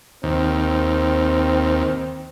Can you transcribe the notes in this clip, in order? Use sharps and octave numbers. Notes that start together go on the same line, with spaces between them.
D#2 C4